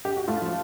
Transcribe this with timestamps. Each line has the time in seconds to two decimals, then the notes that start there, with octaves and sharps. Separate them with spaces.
0.05 G4
0.17 F#4
0.28 A3 F4
0.42 F3